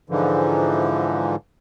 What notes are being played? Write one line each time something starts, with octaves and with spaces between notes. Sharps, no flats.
G#2 D3 E3 F3